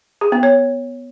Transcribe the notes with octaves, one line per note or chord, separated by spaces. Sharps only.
G#4
B3
C#5